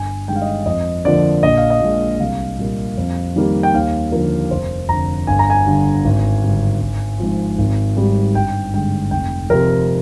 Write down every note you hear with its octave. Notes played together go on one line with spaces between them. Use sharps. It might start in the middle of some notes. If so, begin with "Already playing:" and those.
Already playing: G1 G#5
G2 D#3 G#3 G5
F5
D#5
F5
F2 D#5
D3 F3 A#3 D5
A#1 D#5
F5
D#5
A#2 G#3
C2 F5
A#2 G3 A#3
F2
D#3 G3 A#3
G5
D#2 F5
D3 F3 A#4
F1 C5
F2 D3 A#5
G1 G#5
A#5
G#5
G2 D3
G#1
G2 D3
G#1
G#2 F3
G#1
G#2 G3
G1 G5
G2 D3 G#3 G5
F1 G5
F2 C3 A#4